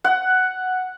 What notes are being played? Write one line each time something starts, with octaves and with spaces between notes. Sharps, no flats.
F#5